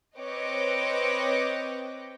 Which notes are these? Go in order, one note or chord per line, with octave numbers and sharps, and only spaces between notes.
C4 B4 C#5 D#5 G5 D6